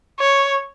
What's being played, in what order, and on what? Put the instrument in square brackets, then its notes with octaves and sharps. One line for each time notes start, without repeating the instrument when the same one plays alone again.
[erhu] C#5